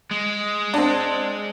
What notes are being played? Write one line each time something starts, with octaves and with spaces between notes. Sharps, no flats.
G#3
C4 D4